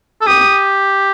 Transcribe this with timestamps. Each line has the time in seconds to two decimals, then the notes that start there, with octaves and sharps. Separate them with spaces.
0.21 A4
0.27 G4 D#6